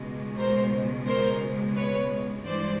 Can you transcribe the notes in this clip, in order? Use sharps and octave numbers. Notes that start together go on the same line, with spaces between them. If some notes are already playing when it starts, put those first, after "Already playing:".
Already playing: C#2 B2 G#3
A#4 C5
A#4 C5
B4 C#5
G2 E3 G#3 C5 D5